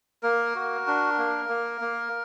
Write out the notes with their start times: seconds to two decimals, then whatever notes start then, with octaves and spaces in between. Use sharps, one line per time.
0.23 A#3 A#4
0.55 F#4
0.87 D4
1.18 A#3
1.49 A#3
1.81 A#3